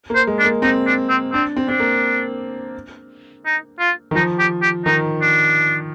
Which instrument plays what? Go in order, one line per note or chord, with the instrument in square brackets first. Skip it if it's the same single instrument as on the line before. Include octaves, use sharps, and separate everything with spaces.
[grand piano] A#3
[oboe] C5
[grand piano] G#3
[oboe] D4
[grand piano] A#3
[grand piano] C4 [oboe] D#4
[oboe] D4
C4
[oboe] C4 [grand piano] D4
[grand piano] C4
[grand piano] C4 [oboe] D4
[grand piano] A#3
[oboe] D#4
F4
[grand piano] D#3
[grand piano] F3 [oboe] D#4
[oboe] G4
G4
[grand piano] D#3 [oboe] D#4
[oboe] D4